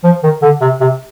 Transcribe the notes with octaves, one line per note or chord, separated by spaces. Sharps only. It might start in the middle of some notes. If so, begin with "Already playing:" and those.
F3
D#3
D3
C3
C3